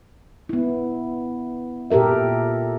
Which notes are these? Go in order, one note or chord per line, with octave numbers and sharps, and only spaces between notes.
B3 E4
A#2 G4 A4 A#4 E5